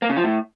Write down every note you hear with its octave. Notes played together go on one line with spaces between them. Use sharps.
A#3
C#3
F3
A2